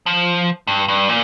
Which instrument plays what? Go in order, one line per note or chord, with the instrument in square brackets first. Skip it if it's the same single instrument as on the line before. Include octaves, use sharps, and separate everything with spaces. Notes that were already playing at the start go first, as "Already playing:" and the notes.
[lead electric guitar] F3
G2
G2
A#2